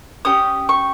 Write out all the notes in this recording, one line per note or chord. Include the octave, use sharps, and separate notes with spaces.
C#4 G4 D#6
C#6